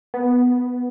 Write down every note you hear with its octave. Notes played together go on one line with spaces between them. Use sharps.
B3